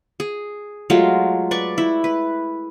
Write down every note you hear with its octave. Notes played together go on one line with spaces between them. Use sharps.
G#4
F#3 G#3 A3 F4
B4 D5 C#6
E4
B4